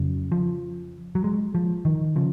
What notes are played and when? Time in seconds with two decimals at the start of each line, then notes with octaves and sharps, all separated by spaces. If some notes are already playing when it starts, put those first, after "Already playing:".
Already playing: F2 C#3 F#3
0.32 F3
1.15 F#3
1.24 G#3
1.55 F3
1.85 D#3
2.16 C#3 F3